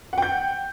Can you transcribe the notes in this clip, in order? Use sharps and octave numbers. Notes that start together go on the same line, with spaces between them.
F#5 G5 G6